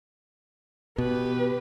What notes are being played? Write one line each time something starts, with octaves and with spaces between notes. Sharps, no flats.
B2 G4 B4